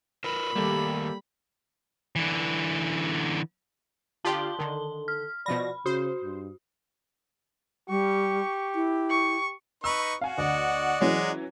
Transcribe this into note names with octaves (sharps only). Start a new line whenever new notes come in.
F4 A#4 B4 B5
D#3 G3 A3 A#3 G4 A4
D3 E3
D3 F4 G4 D5 A5 C6 G7
D3 D#3 A4
F6
B2 F3 D5 B5 A#6
C#3 F#4 C5
G2
G3 G4 C#6
E4
C#6
D#4 B4 C#6 E6
F#4 F5 G#5
D2 D5 D#5 F#5
E3 F#3 G#3 C#4